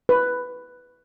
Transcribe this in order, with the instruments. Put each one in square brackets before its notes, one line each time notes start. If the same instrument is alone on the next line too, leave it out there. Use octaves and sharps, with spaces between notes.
[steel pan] B4